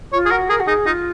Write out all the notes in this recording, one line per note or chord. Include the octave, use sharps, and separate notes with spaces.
F4 C#5
G#4
F#4 A#4
G#4 A#4
F#4
D#4 G#4
D#4 F4